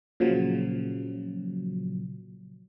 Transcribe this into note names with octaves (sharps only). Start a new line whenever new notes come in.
A#2 C#3 F3 F#3